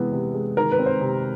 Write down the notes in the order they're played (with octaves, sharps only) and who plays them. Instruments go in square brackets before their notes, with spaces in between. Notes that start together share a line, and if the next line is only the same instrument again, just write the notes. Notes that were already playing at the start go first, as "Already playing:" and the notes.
Already playing: [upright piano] C3 E3 G#3 B3
C3
G#3
D#3 A#4
B4
C4
C5
C3